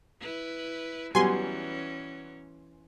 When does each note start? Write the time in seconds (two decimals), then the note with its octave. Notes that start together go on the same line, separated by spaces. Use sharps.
0.21 E4 B4
1.15 E3 F#3 G3 B3 C#4 G#5 C6